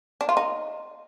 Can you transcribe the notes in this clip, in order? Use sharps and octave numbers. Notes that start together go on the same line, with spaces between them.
D4
F4
D#4